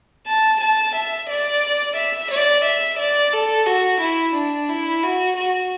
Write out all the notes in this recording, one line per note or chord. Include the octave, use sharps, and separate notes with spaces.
A5
A5
E5
D5
E5
D5
E5
D5
A4
F#4
E4
D4
E4
F#4
F#4